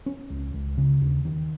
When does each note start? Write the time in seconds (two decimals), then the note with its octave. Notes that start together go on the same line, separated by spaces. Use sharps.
0.06 C#4
0.30 C#2
0.54 C#2
0.77 C#3
1.01 D#2
1.25 D#3